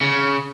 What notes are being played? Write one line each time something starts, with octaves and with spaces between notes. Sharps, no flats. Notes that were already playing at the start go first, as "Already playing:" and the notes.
C#3